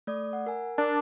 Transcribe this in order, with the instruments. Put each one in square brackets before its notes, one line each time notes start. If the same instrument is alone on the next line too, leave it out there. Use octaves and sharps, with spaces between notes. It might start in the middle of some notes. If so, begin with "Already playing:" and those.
[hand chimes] A3 D5 D#6
F#5
A#4 G#5
[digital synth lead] D4 [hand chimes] A#4